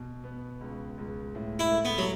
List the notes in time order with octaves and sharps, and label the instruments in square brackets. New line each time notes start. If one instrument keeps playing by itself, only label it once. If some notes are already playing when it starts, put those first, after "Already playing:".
Already playing: [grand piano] B2
B3
C#2
C#2
A2
[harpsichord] E4
[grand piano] A3
[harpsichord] B3
F#3